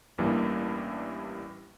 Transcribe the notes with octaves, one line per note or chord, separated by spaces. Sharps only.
A1 G2 E3 G3 A#3